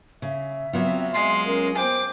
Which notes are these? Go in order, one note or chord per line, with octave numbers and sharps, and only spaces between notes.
C#3 E5
F#3 B3 C4 F4
G#3 C6
C#4 A#4
C5 G5 D6